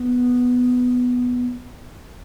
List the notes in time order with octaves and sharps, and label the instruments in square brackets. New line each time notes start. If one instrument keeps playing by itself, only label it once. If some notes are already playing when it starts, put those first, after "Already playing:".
Already playing: [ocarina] B3